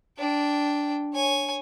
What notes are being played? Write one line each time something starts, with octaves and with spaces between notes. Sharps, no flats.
D4 G5
C#5 G#5